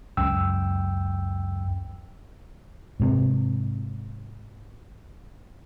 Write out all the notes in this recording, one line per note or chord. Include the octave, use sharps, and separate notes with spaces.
C#2 F#2 G5 E6
G#2 C3